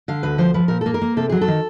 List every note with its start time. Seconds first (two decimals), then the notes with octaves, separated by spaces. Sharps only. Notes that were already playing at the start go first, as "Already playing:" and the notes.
0.08 D3 F5
0.23 D2 B4
0.38 F3 C5
0.54 F3 B4
0.68 A#2 A#4
0.81 A#3 A4
0.94 A#4
1.02 A#3
1.17 C3 A4
1.30 F#3 G#4
1.41 A4
1.48 D#3